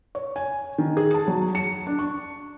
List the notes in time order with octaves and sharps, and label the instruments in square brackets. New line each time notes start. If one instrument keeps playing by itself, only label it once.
[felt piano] C#5
G#5
D#3
G#4
A5
F#3
C#7
D4
C#6